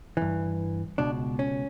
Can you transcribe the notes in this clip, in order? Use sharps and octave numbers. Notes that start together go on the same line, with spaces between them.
G2 E3
C#2 B2 D4
C#4